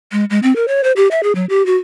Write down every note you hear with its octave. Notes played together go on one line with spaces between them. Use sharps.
G#3
G#3
C4
A#4
C#5
C5
G4
E5
G#4
F#3
G4
F#4